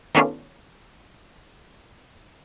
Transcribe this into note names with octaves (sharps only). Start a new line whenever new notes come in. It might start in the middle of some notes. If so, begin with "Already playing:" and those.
D#3 A3 B3 C#4 D4 F4